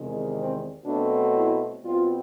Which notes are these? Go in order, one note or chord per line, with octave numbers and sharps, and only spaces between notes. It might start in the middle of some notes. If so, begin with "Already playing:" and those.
Already playing: E2 C3 D#3 G#3
C4
B2 F#3 A3 C4 D4
E4
B2 G3 C4 F4